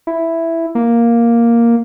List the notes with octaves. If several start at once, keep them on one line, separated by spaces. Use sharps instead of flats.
E4
A#3